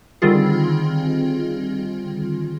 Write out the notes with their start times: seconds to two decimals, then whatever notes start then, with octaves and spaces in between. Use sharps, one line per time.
0.22 D3 D#3 G3 C4 F4 G#4